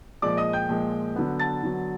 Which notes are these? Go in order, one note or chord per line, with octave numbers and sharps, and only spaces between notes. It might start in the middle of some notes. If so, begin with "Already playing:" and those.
A#2 F3 G#3 D5 D6
D#5 D#6
G5 G6
A#2 F3 G#3
D3 F#3 B3
A5 A6
D3 F#3 B3